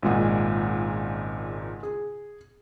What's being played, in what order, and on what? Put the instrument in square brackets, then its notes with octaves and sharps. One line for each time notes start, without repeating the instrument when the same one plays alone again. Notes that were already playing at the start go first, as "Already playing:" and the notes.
[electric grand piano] G#1 A#2 [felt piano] C#2 G#3 F#5
[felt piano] G#4